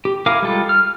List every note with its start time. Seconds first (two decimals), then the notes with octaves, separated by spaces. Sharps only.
0.05 G4
0.26 E4 A#4 F5 G#5 D6
0.42 G3 G#3 F4 A4
0.69 F6